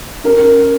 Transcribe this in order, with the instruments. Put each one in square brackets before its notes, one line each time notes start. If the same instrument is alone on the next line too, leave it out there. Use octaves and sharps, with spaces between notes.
[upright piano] C#4 A#4